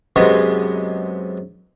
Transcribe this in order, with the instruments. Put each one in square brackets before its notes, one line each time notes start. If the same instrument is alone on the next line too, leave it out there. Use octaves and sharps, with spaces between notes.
[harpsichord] F#2 C3 G#3 B3 D#4